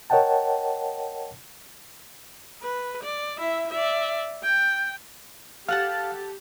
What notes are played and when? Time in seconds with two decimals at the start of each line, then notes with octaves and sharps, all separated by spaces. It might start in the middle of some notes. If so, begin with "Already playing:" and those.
0.10 A#4 C#5 D#5 F#5 G5 A5
2.62 B4
3.03 D5
3.38 E4 E5
3.70 D5 E5
4.43 G5
5.68 G4 A4 F5 F#5 A5 F6